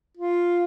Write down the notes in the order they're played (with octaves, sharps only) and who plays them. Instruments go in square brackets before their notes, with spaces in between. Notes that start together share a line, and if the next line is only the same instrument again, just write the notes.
[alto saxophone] F4